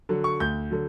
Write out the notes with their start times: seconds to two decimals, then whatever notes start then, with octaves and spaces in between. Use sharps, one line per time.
0.09 D3 F#3
0.24 C#6
0.40 D2 G6
0.71 D3 F#3